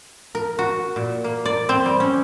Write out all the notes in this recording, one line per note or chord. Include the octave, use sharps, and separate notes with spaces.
A#4
F#4
A#2
A#3
D5
C4
G3
C#4